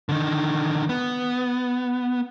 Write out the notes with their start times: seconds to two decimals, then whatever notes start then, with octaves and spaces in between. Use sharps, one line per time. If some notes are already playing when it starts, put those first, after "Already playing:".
0.09 D3 D#3
0.89 B3